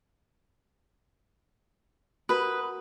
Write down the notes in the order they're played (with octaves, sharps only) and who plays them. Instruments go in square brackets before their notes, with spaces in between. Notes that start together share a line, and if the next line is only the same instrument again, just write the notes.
[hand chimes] F#4 A#4 D#6 [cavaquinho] B4 B5